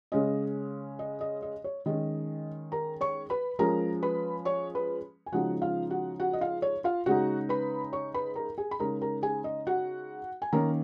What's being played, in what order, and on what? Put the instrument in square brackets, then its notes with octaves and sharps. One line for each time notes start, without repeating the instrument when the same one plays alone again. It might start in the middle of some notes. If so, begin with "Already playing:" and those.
[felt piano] C#3 G#3 C#4 D#5
D#5
D#5
D#5
C#5
D#3 G#3 C#4 D#5
A#4 A#5
C#5 C#6
B4 B5
F3 G#3 C#4 A#4 A#5
B4 B5
C#5 C#6
B4 B5
G#5
C#3 F3 G#3 D#4 F#4 F#5
F4 F5
F#4 F#5
F#4 F#5
D#5
F4 F5
C#5
F4 F5
C#3 G#3 D#4 F#4 F#5
B4 B5
C#5 C#6
B4 B5
A#4 A#5
G#4 G#5
B5
C#3 G#3 D#4 A#4 A#5
A#4 A#5
G#4 G#5
D#5
F#4 F#5
G#5
D#3 A#3 C#4 A#4 A#5